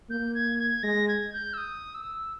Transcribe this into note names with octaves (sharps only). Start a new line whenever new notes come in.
A#3 G6
G#6
G#6
G#3 A#6
G#6
G6
E6
D#6
E6